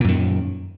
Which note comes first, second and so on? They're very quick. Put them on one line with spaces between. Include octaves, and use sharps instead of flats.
A#2 F#2 D#3